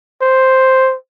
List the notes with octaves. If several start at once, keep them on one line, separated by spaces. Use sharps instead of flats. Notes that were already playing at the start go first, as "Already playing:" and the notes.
C5